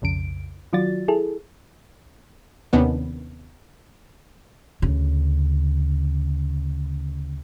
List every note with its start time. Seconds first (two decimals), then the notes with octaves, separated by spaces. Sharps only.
0.02 B1 F2 C#3 D7
0.73 D#3 F#3 F4 F#4 D5 A6
1.08 E4 G#4 A4
2.73 D#2 C3 D#3 B3 C#4 D4
4.82 D2 C#3